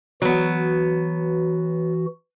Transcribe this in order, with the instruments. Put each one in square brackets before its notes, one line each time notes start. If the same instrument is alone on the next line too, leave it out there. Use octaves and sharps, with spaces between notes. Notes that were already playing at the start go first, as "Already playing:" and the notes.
[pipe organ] E3 F#4 [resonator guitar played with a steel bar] F#3 B3